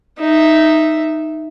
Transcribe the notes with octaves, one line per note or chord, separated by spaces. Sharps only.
D#4 E5